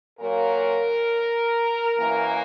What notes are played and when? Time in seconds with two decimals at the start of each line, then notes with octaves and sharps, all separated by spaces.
0.19 A#2 F#3 A#3 A#4
1.98 F#2 E3 A#3